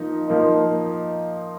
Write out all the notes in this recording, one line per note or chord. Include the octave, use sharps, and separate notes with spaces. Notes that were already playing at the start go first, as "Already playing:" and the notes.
Already playing: F3 A#3 D#4
F3 A#3 D#4